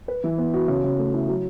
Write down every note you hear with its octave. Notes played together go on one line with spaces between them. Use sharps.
B4
E3
B3
F#4
C#3
C#3
A3
E4
F#3